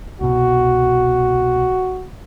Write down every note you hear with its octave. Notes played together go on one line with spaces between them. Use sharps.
C2 B2 F#4